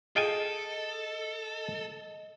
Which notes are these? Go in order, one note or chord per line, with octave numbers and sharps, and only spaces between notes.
F4 G#4 A4 D#5 G5 G#5